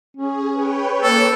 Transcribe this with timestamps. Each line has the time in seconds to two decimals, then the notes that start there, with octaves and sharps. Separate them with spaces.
0.17 C#4 G#4
0.52 B4 C#5 G5
1.03 A#3 A4